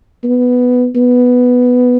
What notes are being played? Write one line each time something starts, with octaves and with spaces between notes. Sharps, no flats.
B3
B3